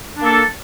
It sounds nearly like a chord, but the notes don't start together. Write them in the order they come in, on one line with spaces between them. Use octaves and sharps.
D4 A#3 A4